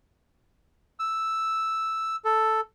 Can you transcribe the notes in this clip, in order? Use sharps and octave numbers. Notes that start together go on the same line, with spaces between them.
E6
A4